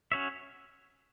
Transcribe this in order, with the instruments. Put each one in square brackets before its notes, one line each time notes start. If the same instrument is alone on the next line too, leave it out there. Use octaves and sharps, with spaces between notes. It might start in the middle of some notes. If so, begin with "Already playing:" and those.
[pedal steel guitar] C#4 F#4 C#5 E5